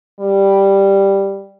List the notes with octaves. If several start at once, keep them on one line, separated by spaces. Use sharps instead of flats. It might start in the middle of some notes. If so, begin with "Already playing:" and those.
G3